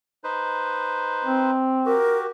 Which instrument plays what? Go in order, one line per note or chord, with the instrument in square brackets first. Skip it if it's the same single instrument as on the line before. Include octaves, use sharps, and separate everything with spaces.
[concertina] D#4 B4 C5
[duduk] C4
[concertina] F#4 G4 [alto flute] A#4